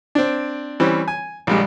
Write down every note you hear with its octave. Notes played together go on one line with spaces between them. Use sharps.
C4 D4
E3 G3 C4 C#4
G#5
A#1 G3 G#3